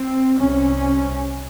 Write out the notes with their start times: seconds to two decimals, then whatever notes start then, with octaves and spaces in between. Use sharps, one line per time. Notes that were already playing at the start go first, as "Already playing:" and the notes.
Already playing: C4
0.39 C2 C3 C#4